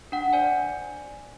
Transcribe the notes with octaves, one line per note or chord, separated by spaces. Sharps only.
D4 F#5
C5 D5 G#5